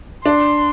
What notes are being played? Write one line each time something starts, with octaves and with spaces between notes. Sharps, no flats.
D4 C6